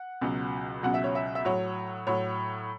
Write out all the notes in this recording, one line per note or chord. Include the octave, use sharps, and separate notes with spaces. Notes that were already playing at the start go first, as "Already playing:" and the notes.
Already playing: F#5
C#2 B2 F#3
C#2 B2 F#3 F#5
E5
C#5
E5
E5
A2 F#3 C#5
A2 F#3 C#5